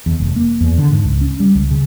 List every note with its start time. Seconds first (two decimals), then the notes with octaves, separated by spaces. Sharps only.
0.06 E2
0.20 F1
0.36 A#3
0.61 E2
0.78 D3
0.91 G#2
1.05 C#2
1.21 C#4
1.40 G3
1.55 C#2
1.71 C#3